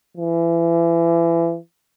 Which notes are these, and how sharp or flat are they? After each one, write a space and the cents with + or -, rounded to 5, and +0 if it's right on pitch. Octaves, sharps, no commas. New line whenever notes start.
E3 +30